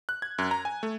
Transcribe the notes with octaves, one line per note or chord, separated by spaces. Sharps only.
F#6
G#6
F#2
A#5
G#5
A3